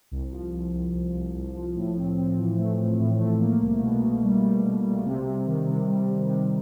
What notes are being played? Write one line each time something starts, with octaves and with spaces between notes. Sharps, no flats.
C2
F3
C2
C2
C2
C2
C2
F3
A2
C4
C4
E3
A3
A2
A2
A3
A#3
C2
B2
B2
G3
G3
B2
G3
C3
C3
D#3
C3
G3
C3
C3